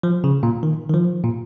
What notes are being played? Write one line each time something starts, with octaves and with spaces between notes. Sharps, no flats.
F3
C#3
A#2
D#3
D#3
F3
A#2